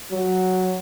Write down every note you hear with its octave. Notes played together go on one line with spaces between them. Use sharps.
F#3